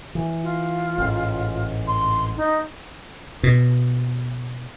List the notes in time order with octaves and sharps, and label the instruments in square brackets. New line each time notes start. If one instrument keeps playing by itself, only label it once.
[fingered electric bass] E3
[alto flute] F4
[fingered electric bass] A1 G#2
[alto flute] C6
D#4
[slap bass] B2